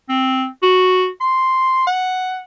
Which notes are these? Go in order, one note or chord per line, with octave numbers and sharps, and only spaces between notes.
C4
F#4
C6
F#5